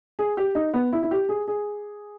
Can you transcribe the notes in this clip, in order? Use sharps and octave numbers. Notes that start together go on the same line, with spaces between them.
G#4
G4
D#4
B3
E4
E4
G4
G#4
G#4